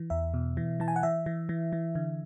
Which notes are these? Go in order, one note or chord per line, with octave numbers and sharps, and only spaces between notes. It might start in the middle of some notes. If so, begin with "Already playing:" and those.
Already playing: E3
E2 E5
B2
E3
E3 A5
G#5
F#5
E3 E5
E3
E3
E3
D3